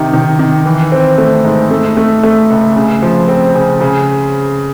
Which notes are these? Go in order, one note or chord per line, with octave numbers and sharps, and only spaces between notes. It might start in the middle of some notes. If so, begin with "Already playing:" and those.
Already playing: C3 D#3
D#3
D#3
E3
C4
A3
G#2
A3
A3
A3
C#2
C#3
F3
C4
C#3
C#3